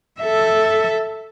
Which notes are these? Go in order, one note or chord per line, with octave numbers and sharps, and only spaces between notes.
A4 E5